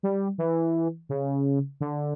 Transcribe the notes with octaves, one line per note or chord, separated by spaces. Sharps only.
G3
E3
C#3
D3